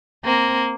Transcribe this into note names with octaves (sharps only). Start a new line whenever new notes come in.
A#3 C4